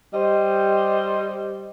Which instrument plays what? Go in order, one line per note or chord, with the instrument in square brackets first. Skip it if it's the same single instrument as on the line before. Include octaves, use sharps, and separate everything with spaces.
[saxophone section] G3 C5 D#5